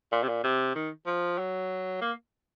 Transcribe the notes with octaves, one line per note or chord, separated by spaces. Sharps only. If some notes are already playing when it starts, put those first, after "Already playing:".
A#2
C3
A#2
C3
D#3
F3
F#3
A#3